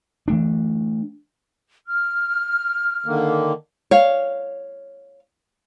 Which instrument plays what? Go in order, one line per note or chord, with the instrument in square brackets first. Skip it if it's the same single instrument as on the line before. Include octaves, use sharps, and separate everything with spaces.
[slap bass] E3 A3 D4
[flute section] F6
[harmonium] D3 D#3 A#3
[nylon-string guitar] C#5 F5